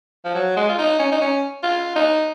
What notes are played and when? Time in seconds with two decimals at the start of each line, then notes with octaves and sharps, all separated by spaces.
0.25 F3
0.35 F#3
0.57 G#3
0.69 F4
0.78 D#4
0.99 C#4
1.12 D#4
1.21 C#4
1.63 F4
1.96 D#4